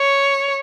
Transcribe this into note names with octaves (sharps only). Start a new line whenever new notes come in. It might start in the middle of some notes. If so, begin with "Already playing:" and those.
Already playing: C#5